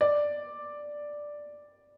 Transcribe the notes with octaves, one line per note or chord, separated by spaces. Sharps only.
D5